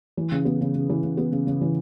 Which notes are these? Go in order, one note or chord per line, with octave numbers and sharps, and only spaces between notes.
E3
C#3
B3
C#3
C#3
E3
C#3
B3
C#3
C#3
E3